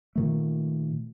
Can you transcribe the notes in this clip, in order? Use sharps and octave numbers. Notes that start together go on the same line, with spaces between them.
A#2 D#3 A3